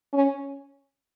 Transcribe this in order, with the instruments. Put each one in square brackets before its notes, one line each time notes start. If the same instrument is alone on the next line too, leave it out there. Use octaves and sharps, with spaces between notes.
[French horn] C#4